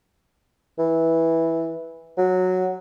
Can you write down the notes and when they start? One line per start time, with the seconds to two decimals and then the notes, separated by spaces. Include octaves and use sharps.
0.78 E3
2.18 F#3